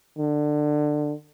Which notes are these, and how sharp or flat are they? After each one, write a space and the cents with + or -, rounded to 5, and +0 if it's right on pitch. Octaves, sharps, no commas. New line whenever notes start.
D3 +20